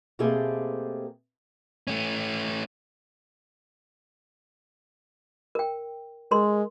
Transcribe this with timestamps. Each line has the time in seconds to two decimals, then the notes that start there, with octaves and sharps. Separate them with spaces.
0.19 B2 A3 A#3 C4 G4 G#4
1.87 A3 C#4
5.55 A#4 G5
6.31 G#3 A#4 C6